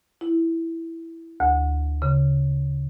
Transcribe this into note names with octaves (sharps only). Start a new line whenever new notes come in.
E4
D2
C#3